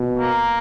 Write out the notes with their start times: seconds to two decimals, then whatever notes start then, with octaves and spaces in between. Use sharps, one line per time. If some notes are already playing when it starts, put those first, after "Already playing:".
Already playing: B2
0.18 A#3